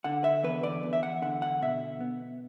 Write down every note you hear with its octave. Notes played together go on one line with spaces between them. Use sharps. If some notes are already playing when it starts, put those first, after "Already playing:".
D3 F#5
E5
E2 B4
D5
E2
E5
F#5
D3 F#5
F#5
B2 E5
B3